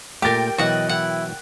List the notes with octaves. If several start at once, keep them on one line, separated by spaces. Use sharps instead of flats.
A#2 A3 G4 A#4 G5 A6
B2 E3 F#3 F#4 D#5 F#5
E4 F#5